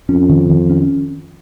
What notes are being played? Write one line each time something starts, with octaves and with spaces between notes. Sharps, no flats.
F2 C#4
D#3
D#3
C#4